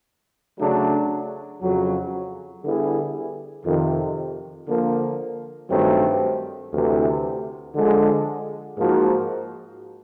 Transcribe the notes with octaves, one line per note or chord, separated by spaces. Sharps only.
C#3 F#3 A3 D4
F2 C#3 F#3
D3 G3 B3 E4 G#4
F2 C3 D#3
D3 F3 A#3
G2 D#3 F#3 A3 C4
D2 C3 E3
D3 F3 G#3
G#2 F3 A#3 D#4 F#4